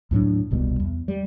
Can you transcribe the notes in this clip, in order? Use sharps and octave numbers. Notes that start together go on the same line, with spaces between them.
D#2 A2 F#3 D4
D#1 C2 B2 G3
E2
G3